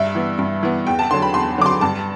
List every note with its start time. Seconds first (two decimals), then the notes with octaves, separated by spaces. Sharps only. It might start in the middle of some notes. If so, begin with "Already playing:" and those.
Already playing: G2 E5
0.15 E3 B3
0.39 G2
0.63 E3 B3
0.87 E2 G5
0.99 A5
1.11 D3 F#3 C6
1.22 B5
1.34 E2 C6
1.58 D3 F#3 D6
1.66 C6
1.81 G2 A5